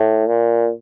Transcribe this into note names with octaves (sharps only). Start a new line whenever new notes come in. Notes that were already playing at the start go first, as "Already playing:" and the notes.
Already playing: A2
A#2